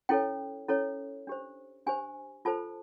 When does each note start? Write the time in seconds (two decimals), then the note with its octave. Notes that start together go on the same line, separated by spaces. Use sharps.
0.09 C#4 E4 A4 C#5 G5
0.69 C#4 E4 A4 C#5
1.27 D4 G4 C5
1.87 D4 G4 C5 G#5
2.45 F4 A4 C5 A5